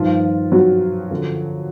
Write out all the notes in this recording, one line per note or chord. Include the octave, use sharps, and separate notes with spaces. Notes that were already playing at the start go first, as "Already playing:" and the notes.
Already playing: G2 D#3 F3 F4
F#3 F#4
F#2 D3 F3